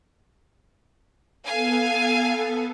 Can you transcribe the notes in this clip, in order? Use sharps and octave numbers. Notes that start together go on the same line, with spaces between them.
B3 A4 F5 G#5